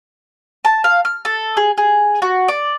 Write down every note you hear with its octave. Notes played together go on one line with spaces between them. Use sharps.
A5
F5
F6
A4
G#4
G#4
F#4
D5